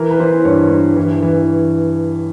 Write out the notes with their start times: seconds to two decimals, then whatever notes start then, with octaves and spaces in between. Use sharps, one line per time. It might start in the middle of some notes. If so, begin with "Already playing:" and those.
Already playing: E3 A#4
0.10 B4
0.19 E3 C5
0.45 G2 C#5
0.70 G2
0.96 E3
1.22 E3